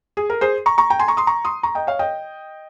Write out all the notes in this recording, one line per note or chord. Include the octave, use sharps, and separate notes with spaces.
G#4
A#4
G#4 C5
A#5 C#6
A#5 C#6
G5 A#5
G#5 C6
A#5 C#6
C6 D#6
A#5 C#6
C6 D#6
A#5 C#6
D#5 G5
C#5 F5
D#5 G5